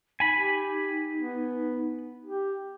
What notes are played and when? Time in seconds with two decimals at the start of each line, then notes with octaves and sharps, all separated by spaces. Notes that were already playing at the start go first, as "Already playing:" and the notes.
0.20 D#4 G#5 B5
0.33 G4
1.16 B3
2.25 G4